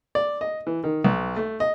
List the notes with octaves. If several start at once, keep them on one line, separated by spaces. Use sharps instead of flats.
D5
D#5
E3
D#3
B1
A3
D#5